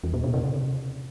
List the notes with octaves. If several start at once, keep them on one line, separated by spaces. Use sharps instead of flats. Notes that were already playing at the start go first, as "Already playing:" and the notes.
E2
A#2
B2
C#3
C3